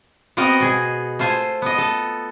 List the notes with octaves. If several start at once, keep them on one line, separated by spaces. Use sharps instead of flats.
B3 C4 F#4 A#4 D#5
B2 G#4 G#5
A3 F4 C5 G#5
B3 D#5
A4